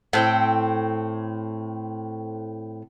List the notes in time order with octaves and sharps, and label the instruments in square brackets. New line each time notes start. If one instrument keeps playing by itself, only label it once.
[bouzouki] A2 C4 G5